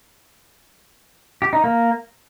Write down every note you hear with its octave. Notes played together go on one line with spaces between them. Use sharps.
G4
D#4
A#3